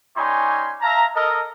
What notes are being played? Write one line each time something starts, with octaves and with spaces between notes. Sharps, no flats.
G3 C#4 D#4 C#5 G#5 C6
E5 F5 A5 A#5
A4 A#4 D#5